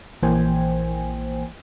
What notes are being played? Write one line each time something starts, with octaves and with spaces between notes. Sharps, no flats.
A#1 E3 A#3 C5 G5 G#5